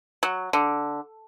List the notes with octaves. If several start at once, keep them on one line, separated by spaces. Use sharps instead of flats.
F#3
D3